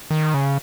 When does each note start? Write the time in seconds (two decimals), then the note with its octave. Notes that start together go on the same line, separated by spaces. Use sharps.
0.11 D#3
0.34 C#3